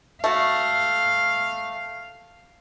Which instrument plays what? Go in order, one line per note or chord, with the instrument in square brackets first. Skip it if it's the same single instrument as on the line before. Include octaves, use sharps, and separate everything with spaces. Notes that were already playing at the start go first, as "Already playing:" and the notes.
[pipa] A3 F#4 [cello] F5